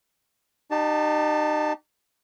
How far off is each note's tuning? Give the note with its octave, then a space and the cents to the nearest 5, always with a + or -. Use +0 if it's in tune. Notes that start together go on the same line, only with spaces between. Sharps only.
D#4 -35 G4 -20 A5 +5